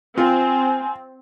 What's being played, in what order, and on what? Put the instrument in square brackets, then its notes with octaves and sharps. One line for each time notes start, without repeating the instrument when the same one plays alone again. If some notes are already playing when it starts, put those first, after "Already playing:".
[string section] C4 [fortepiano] F4 [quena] G#5